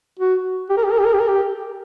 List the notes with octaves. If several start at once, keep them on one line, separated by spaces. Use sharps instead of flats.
F#4
G4
A#4
G4
A#4
G4
A#4
G4
A#4
G4